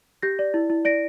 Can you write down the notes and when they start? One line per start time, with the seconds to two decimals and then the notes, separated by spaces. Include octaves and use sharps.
0.22 G4 G6 A#6
0.39 D5
0.54 E4
0.70 E4
0.85 D5 A#6 D7